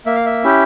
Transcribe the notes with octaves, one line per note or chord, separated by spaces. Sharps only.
A#3 E5
F5
E5
C#4 E4 G4